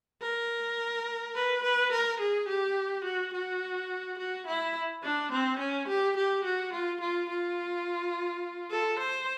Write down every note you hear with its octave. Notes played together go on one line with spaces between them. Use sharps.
A#4
B4
B4
A#4
G#4
G4
F#4
F#4
F#4
E4
D4
C4
C#4
G4
G4
F#4
F4
F4
F4
A4
C5